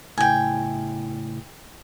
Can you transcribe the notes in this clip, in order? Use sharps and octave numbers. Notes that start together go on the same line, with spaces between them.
A2 C#3 E4 G5 G#5